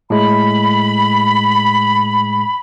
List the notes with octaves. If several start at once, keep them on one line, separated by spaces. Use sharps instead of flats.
A2 G#3 B5